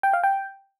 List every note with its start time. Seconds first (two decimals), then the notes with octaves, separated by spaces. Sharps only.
0.03 G5
0.13 F5
0.23 G5